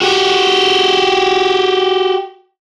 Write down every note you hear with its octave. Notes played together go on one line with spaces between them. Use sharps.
F#4 G4